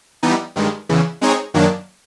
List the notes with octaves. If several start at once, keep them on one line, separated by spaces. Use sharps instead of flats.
E3 G3 B3 D#4
G2 D#3 G#3
E2 C#3 E3
G#3 C4 D#4 G#4 C#5
F#2 D#3 F#3 A#3 D4